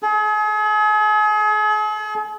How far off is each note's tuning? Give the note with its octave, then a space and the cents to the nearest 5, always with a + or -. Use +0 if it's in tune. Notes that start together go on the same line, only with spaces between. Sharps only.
G#4 +40